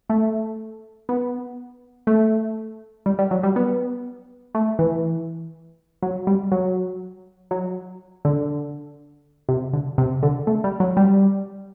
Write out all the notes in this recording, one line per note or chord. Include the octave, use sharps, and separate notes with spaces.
A3
B3
A3
G3
G3
F#3
G3
B3
A3
E3
F#3
G3
F#3
F#3
D3
C3
D3
C3
D3
A3
G3
F#3
G3